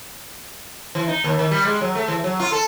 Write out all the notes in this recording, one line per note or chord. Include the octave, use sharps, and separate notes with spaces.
E3
D#4
D#2
D#3
G3
G#3
F#3
A3
E3
F#3
F4
A4